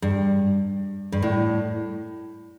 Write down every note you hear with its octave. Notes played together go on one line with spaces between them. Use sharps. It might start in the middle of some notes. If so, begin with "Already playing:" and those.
G2
G2
A2